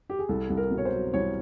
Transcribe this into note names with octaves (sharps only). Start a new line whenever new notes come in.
G4
G#4
C2 A4
C2
A#4
B2
C#5
C5
F#3
C2 C#5